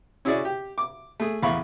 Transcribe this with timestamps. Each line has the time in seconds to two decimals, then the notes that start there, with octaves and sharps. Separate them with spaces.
0.25 C#4 E4 F#4 G#4 D5
0.45 G4
0.78 D6
1.20 A3 G#4
1.43 A1 E2 F5 B5 C#6